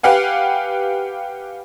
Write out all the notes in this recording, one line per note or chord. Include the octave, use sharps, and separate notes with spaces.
G4 B4 F5 F#5 G#5